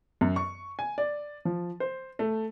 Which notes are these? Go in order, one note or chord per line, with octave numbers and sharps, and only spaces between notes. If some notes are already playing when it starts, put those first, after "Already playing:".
F#2
C#6
G#5
D5
F3
C5
A3